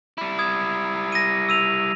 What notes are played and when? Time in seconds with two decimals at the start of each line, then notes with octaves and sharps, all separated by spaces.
0.18 G3 E4
0.39 D#6 G#6
1.12 A#6 D#7
1.49 E6 D#7 F7